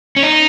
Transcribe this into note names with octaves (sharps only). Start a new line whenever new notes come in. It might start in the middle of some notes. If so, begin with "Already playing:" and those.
C#4
D#4